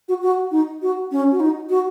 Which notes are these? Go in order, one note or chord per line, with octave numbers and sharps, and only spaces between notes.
F#4
F#4
D#4
F#4
C#4
F#4
D#4
F#4